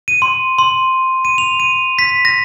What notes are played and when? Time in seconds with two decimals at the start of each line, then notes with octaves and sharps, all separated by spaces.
0.08 D#7
0.22 C6
0.58 C6
1.25 D#7
1.38 F7
1.60 D#7
1.99 B6
2.25 A#6